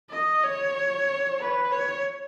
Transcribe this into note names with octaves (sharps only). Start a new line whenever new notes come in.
D#5
C#5
B4
C#5